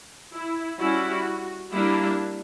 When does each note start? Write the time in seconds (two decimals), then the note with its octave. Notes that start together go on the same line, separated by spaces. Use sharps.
0.33 E4
0.79 G3 C#4 E4 F#4
1.72 G3 A#3 D4 E4